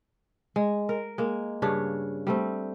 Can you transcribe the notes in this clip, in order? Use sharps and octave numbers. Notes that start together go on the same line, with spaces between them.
G#3
A#4
G#3 A#3
G2 C#3 D4 C#5
G3 A3 C4